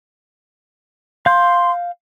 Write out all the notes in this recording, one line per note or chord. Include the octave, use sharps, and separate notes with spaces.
F5 C6 G6